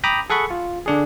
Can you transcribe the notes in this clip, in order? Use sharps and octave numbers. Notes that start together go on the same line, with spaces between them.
G5 A#5 B5 D6 D#6
G#4 A4 F#5 B5 C#6
F4
D3 D4 G#4